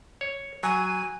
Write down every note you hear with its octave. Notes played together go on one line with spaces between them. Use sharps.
C#5
F#3 G#5